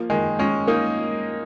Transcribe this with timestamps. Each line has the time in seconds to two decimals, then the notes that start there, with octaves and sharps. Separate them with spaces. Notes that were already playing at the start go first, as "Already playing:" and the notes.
Already playing: F3 A#3
0.10 D#3 G#3
0.39 G#3 C#4
0.67 A#3 D#4